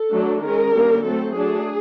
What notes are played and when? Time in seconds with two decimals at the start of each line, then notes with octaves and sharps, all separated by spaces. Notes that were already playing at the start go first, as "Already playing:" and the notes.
Already playing: A4
0.13 F#3 A3 D4
0.42 D#3 G#3 C#4 A#4
0.73 D3 G3 A#3 C#4
1.04 F#3 A3 C4 A4
1.33 F#3 A3 D4 G#4